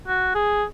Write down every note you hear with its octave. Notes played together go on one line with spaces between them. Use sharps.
F#4
G#4